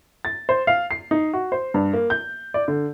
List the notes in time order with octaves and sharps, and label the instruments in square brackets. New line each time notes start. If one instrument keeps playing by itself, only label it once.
[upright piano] A6
C5
F5
C7
D#4
F#4
C5
G2
A#3
G6
D5
D3